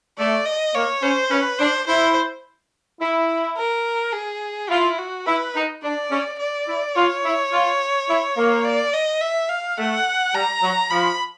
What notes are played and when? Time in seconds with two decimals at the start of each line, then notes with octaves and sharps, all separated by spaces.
0.18 A3 D5
0.46 D#5
0.74 A#3 C#5
1.02 C#4 C5
1.31 C#4 B4
1.59 D4 C5
1.87 E4 C5
3.00 E4
3.57 A#4
4.13 G#4
4.70 E4 F4
4.99 F#4
5.26 E4 B4
5.55 D#4
5.83 D4 D5
6.11 C#4
6.39 D5
6.67 E4
6.95 F4 C#5
7.24 E4
7.52 F4
8.09 E4
8.37 A#3
8.65 D5
8.93 D#5
9.21 E5
9.49 F5
9.78 A3 F#5
10.34 G3 A#5
10.62 F#3
10.90 F3 B5